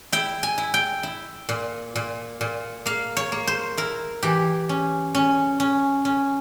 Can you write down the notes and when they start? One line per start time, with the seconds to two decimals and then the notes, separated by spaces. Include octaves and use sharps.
0.12 E4 G5
0.43 G#5
0.58 E4
0.74 G5
1.03 E4
1.49 A#2
1.95 A#2
2.41 A#2
2.86 A#3 F5
3.17 C#5
3.32 A#3
3.47 C5
3.77 E4 A#4
4.23 E3 G4
4.69 C#4
5.15 C#4
5.60 C#4
6.05 C#4